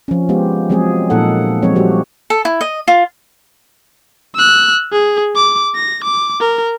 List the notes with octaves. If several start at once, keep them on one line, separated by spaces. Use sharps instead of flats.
F3 C#4
G#3 B3 F4 G4
F3 F#3 G#3 C4 G#4
A#2 F3 A#3 D#4 A4 F#5
F3 F#3 G#3 C4 C#5
F3 G3 F#4 G4
A4
E4
D#5
F4
E6 F#6
G#4
D6
A#6
D6
A#4